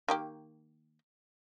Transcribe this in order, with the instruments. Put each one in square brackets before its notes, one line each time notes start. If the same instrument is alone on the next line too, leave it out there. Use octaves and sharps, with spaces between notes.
[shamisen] D#3 A#3 G4